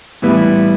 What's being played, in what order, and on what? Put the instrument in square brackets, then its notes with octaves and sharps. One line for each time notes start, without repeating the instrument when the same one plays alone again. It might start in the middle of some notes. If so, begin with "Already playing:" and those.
[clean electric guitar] A2 E3 G3 B3 E4